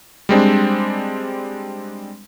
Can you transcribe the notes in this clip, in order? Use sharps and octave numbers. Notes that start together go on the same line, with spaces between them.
G3 G#3 C4 D4